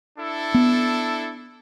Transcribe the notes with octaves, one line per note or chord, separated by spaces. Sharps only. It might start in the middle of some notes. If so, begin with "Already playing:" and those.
D4 E4 A4
B3